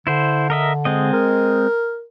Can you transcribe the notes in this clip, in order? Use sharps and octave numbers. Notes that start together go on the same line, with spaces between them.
D3 E4 C5
A#4 D#5 E5
G#3 C4 D#5
A#4